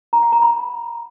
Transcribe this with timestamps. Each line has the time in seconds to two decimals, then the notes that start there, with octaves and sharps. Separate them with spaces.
0.13 A#5
0.23 F#5
0.32 A#5
0.42 B5